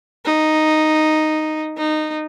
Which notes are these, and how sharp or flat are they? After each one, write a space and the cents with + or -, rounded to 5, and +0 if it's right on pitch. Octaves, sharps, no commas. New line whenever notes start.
D#4 -5
D#4 -15